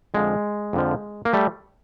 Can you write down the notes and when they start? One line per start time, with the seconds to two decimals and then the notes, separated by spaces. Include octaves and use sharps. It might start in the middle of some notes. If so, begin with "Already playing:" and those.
0.14 F2 D3 F3 G#3
0.73 F2 D3 F3
1.25 A#3
1.33 G3 A3